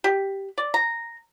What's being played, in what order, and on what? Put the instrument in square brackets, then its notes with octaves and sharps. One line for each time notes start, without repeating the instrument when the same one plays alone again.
[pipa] G4
D5
A#5